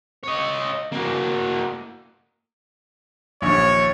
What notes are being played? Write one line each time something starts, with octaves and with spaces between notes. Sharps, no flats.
C#5 D#5
A#3 F#4
A#1 D#2 C#5